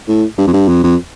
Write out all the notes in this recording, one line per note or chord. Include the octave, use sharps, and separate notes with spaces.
A2
G2
F2
G2
F2
F2